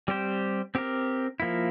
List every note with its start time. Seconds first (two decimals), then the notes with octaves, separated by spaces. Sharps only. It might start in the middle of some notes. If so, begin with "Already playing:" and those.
0.08 G3 C4 G4 C5
0.75 C4 G4 A#4
1.40 F3 A#3 E4